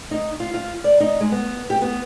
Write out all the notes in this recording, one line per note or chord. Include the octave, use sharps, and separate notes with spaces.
D#4
F4
F4
D5
D#4
G#3
B3
G4
B3